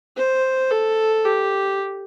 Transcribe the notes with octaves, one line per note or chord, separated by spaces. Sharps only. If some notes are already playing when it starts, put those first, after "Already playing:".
C5
A4
G4